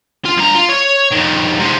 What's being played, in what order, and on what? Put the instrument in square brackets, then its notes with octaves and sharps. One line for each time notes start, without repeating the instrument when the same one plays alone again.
[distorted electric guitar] F4
G2 A#5
F4
C#5
F2 D#3
G#2 C3